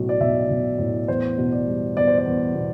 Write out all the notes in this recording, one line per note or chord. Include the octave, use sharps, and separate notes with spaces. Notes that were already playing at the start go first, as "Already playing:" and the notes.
Already playing: B1 A2 F#3
D5
B1 E5
B1
A2
E2 C5
B2
D5
G3
E2 D5
C5
D5
E2
B2